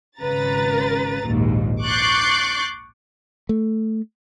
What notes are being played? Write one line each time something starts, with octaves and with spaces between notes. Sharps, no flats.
G#1 C#3 B4 A#5 A6
A#1 D#2 G#2
C#6 D6 F#6 G6 A6 C7
A3